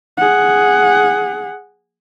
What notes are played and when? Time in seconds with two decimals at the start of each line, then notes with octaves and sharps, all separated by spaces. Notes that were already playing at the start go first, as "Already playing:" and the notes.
0.18 G#4 F#5